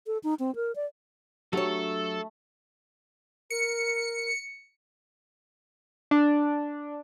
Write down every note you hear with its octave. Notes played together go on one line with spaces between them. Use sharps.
A4
D#4
C4
A#4
D5
F#3 A3 D4 G4 A4 C#5
A#4 C#7
D4